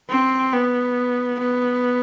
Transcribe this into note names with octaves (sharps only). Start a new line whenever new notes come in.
C4
B3
B3